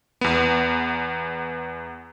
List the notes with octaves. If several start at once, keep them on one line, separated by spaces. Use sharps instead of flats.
E2 B3